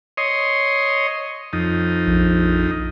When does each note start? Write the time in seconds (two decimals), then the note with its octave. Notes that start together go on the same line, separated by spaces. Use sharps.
0.17 C#5 D#5 C6
1.53 F2 D#4
2.07 A#1